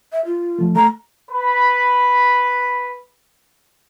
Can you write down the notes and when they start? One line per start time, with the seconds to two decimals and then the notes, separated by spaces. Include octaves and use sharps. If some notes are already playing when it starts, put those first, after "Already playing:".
0.12 E5
0.26 F4
0.59 F3 A3
0.76 A3 A#5
1.31 B4 B5